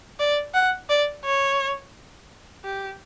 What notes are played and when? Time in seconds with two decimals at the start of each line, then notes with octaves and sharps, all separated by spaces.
0.19 D5
0.54 F#5
0.90 D5
1.25 C#5
2.65 G4